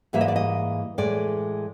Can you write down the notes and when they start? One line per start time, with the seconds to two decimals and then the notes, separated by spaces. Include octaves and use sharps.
0.13 G#2 E3 G3 A#3 E5
0.21 D#5
0.28 D5
0.36 D#5
0.98 A2 E3 G#3 D5